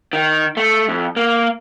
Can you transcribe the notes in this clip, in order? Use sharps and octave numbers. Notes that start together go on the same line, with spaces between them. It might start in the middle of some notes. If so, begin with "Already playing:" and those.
D#3
A3
F2
A#3